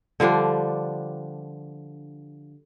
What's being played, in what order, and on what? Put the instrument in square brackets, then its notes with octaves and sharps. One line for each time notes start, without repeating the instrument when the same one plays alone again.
[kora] D3 F3 G3 D4